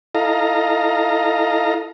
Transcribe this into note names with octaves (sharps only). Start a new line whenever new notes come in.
E4 A4 D#5 F5 A#5